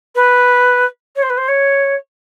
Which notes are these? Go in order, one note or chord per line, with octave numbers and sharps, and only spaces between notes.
B4
C#5
C5
B4
C5
C#5